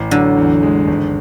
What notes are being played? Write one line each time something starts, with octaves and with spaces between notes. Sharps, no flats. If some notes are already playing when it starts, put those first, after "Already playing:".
Already playing: A1
D3 F#3
E2
G#3
G#1